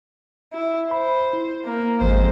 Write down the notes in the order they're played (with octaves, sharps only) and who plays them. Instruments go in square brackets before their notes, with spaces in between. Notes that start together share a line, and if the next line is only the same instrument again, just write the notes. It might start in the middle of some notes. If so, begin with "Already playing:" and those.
[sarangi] E4
[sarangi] C5 [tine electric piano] B5
[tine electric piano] E4
[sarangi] A#3
[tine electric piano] G#1 [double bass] F2 G#3 [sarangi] C5